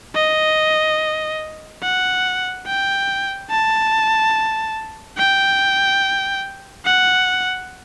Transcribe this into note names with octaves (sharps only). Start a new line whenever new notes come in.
D#5
F#5
G5
A5
G5
F#5